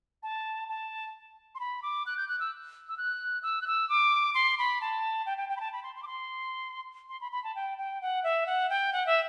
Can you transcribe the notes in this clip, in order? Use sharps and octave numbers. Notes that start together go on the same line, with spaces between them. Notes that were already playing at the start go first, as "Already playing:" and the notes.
A5
A5
C6
B5
D6
F#6
G6
F#6
E6
E6
F#6
E6
F#6
E6
D6
C6
B5
A5
G5
G5
G5
B5
A5
B5
C6
C6
D6
C6
C6
B5
B5
A5
G5
G5
F#5
E5
F#5
G5
F#5
E5